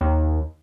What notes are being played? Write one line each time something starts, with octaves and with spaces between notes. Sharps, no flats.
D#2